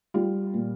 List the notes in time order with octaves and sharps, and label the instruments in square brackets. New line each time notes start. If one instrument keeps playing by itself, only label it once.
[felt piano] G3 F4
A#2